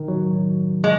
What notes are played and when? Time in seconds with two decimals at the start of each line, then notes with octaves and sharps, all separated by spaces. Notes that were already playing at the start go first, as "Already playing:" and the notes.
Already playing: D#3
0.08 F#3
0.84 G#3